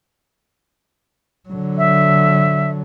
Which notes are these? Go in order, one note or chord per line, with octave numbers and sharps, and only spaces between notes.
D3 F#3
E5